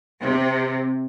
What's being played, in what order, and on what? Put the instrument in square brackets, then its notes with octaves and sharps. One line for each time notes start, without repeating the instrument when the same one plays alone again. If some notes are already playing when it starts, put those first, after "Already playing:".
[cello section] C3